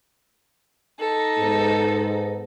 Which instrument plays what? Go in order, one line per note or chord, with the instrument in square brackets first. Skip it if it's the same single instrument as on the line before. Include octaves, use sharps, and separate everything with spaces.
[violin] D#4 A4
[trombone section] G#2 B3